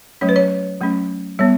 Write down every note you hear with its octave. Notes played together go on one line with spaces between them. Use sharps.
F#3 A3 C#4 C#5
B4
C#5
F#3 A3 C#4
G3 B3 C#5